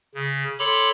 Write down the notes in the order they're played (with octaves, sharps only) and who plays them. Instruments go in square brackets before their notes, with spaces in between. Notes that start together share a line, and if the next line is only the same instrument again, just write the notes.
[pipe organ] C#3
A4 C#5 B5 C6 D6